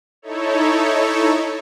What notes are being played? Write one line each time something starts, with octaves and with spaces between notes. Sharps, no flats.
D#4 E4 A4 C#5